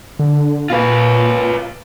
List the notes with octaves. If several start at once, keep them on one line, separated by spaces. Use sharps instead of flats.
D3
A#2 F4 B4